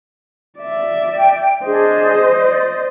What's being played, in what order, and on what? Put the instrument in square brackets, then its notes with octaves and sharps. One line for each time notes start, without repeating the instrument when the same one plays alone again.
[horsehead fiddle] D5 E5
[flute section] G5
[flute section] D4 G#4 [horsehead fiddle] C5 D#5
[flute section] D5